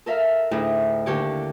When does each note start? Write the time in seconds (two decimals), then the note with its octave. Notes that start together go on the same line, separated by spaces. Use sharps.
0.06 A4 A#4 E5 F5
0.51 D2 A2 D#4 G#4 E5
1.06 D#2 D3 G4 C#5 D5